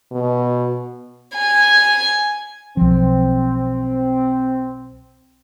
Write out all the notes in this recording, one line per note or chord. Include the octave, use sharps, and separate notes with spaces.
B2
G#5
B1 F3 C4